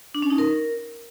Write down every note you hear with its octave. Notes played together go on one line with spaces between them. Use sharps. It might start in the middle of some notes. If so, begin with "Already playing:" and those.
D4
C#4
D#4
A#4